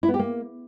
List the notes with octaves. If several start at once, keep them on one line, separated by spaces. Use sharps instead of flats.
E4
B3
G4
A#3